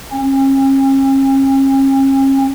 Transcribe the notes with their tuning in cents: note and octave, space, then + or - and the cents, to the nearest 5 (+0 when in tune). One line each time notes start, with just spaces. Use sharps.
C#4 -40